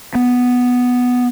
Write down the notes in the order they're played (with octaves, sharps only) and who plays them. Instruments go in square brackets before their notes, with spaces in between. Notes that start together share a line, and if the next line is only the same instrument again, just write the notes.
[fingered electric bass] B3